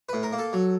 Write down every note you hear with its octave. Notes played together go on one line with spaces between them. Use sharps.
A2 B4
A#4
A#3
A4
F#3